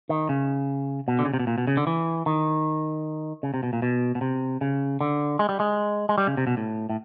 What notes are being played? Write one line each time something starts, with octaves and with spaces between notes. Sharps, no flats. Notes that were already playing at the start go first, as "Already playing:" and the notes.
D#3
C#3
B2
D3
C#3
C3
B2
A#2
B2
C#3
D3
E3
D#3
C#3
C3
B2
A#2
B2
B2
C3
C#3
D3
G#3
G3
G#3
G#3
G3
C#3
C3
B2
A2
A2